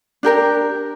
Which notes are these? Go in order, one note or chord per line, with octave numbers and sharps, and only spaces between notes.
D4 G4 A#4 G5